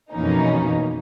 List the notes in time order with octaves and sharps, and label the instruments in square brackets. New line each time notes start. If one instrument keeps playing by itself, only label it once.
[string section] F2 B2 E3 A#3 C#4 D#4